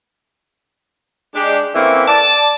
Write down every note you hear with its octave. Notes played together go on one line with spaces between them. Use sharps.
G#3 D4 G4
E3 A3 A#3 C4 C#4 E4
D5 A5